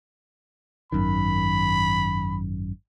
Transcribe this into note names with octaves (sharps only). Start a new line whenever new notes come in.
G#1 F#2 D#3 B5